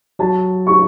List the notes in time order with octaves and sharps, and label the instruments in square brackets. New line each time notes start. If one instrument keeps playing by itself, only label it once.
[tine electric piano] F#3 [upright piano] A5
[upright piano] C#6